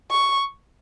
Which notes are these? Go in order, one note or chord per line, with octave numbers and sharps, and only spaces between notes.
C#6